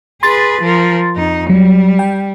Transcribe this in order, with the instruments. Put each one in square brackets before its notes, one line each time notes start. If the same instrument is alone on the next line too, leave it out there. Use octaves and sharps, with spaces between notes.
[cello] G#4 B4 [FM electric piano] C6 A6
[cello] F3 A#4
F2 D#4
[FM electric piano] F#3 [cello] G3
[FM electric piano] G5